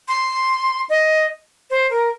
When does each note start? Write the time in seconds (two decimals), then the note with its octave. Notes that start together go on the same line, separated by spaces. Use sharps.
0.08 C6
0.89 D#5
1.70 C5
1.90 A#4